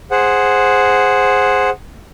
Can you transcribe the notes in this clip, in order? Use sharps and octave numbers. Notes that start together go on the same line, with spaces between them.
G#4 C5 F#5